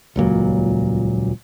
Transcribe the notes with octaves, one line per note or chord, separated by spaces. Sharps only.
D#1 C#2 A#2 F#3